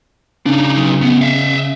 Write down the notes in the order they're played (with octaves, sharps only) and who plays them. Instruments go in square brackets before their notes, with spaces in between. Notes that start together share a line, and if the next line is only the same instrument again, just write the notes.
[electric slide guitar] C#3 [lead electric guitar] D4 D#4
[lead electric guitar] F#3 D#4
D2 B3
E5 F5